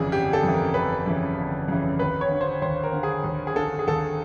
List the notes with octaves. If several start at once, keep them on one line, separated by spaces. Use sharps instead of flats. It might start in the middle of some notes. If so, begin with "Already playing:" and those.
Already playing: G1 F2 C#3 E3 G#4
G1 G4
A4
F2 C#3 E3
A#4
G1 B4
F2 C#3 E3
G1
F2 C#3 E3
D#2 B4
C#5
D3
C5
D#2 C5
A#4
D3
G#4
D#2
G#4
D3 A4
G#4
D#2 A4